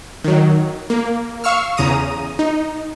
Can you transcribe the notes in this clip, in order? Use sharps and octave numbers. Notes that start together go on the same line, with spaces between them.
D#3 F#3
A#3
F5 C#6 E6 F6
E2 C#3 A#5 D#6 D#7
D#4